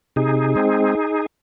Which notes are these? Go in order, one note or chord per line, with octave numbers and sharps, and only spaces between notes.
C3 D#4 G#4
G#3 C4